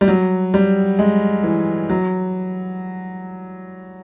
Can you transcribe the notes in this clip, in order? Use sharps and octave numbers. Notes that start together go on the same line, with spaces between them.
G3
F#3
G3
G#3
E3
F#3